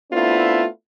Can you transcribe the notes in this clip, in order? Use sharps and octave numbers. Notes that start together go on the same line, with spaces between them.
A3 B3 C4 D4 E4 F4